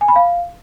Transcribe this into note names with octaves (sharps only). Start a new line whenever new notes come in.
G#5
B5
F5